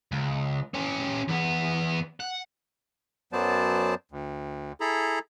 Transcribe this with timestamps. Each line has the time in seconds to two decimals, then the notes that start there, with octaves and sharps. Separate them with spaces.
0.12 C#2
0.74 C#4 G4
1.28 E2 B3
2.20 F#5
3.33 F#2 F#3 B3 C5 D5 A5
4.11 D2
4.81 E4 G#4 A4 A#5 B5